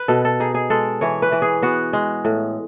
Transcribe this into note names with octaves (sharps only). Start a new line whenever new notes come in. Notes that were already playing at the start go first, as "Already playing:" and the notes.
Already playing: B4
B2 A4
A4
D#4 G#4
G#4
G#3 A4
E3 C#5
B4
E3
G#4
B3 F#4
G#3
A2